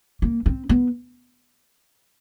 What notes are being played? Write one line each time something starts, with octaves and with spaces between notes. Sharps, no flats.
A#3
C4
B3